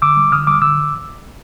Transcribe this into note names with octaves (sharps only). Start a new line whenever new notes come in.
D3 D6 E6
G3
D3 D#6 F6
G3 D6 E6
D3 D6 E6